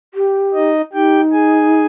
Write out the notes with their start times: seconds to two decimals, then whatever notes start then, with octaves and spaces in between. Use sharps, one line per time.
0.14 G4
0.54 D#4 D#5
0.93 D#4 G4 G5
1.33 G#4 G#5